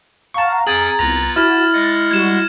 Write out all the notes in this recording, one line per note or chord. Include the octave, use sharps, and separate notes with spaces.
F5 F#5 A5 A#5 C#6
F2 G#4 G5 G#5 A#5 G#6 A6 F#7
C2 B3 F4 B4 A#5
E4 F#4 A5 F6 A6
G#3 D#5 F#5 A6
G3 F#4 G#6 E7